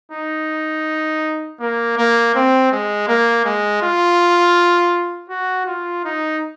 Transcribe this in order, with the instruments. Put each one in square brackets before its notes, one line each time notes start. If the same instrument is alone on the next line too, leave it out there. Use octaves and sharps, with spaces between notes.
[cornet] D#4
A#3
A#3
C4
G#3
A#3
G#3
F4
F#4
F4
D#4